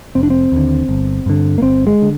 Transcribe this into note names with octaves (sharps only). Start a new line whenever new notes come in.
F1 C4
D4
C4
D#2 D3
G1
G2 D3
A#3
G1 C4
G#3
D3